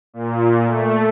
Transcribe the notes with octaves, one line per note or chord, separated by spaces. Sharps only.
A#2
A3